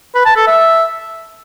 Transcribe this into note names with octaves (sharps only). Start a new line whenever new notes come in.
B4
A5
A4
E5